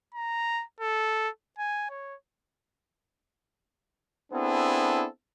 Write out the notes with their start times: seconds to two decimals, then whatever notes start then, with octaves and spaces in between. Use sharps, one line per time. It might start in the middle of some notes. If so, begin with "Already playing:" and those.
0.14 A#5
0.80 A4
1.58 G#5
1.90 C#5
4.32 B3 C4 D4 E4 G#4 A4